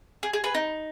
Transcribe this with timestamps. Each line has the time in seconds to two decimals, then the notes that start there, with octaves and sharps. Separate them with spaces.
0.23 G#4
0.33 G#4
0.44 G#4 B4
0.55 D#4